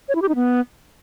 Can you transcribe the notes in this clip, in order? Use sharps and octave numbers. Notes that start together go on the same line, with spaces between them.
C#5
E4
G4
D#4
B3